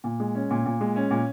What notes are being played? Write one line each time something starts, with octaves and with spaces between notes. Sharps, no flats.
A#2
G#3
C#4
A#2
A#2
G#3
C#4
A#2